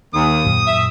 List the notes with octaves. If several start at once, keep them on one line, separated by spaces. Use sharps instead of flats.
D#2 D#6
F#2 A#2
E5